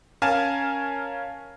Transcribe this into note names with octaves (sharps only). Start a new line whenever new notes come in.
C#4 A#4 F5 G#5 A5